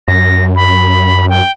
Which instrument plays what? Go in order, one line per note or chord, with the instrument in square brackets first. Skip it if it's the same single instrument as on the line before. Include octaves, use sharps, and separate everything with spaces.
[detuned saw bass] F#2 [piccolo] A#6
[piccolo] B5
G5